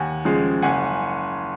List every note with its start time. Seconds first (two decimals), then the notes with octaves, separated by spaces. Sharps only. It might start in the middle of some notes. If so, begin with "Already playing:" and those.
Already playing: D#2 F#5 G#5
0.25 C#3 F3 G#3
0.62 F#1 F#5 G#5